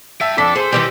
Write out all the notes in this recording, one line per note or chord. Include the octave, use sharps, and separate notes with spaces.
E5 G5 A5
F2 D4 A4 B6
G#4 C5
D#3 E3 G3 G4